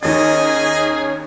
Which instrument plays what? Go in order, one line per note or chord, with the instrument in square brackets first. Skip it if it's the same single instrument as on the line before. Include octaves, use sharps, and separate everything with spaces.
[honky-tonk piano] D#2 A6 [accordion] C#4 D#4 C#5 [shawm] G#4 [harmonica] D#5